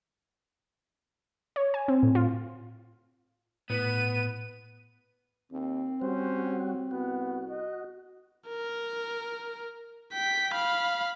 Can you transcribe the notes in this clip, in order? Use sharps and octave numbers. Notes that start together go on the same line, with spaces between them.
C#5
G#5
C4
A2
F4
A2 B3 D#7
D#2 C4
G3 C#4 F#4 C5
C2 B3 F#4
D#5
A#4
G5 B6
F5 B5